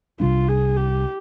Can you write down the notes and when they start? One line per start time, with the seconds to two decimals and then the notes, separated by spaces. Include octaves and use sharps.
0.20 C2 C3 G3 D4 F4
0.48 G#4
0.76 G4